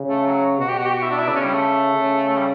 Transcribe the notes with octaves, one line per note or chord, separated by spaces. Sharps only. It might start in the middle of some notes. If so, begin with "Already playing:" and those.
Already playing: C#3
A3
F#3
B2 F#4
G4
F#4
G4
F#4
E4
D4
E4
C#3 D4
C#4
G3
A3
C#3
A3
G3